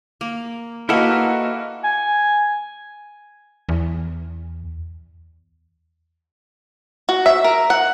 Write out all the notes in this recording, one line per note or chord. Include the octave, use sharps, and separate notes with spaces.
A#3
A#3 E4 F#4 A4 B4 D#5 F#5 F6
G#5
E2
F#4
E5
A#4
F#5